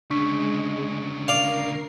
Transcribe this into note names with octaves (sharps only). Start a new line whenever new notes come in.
D2 C#3 G#3 D4 C#6 B6
A#4 D5 F5 C7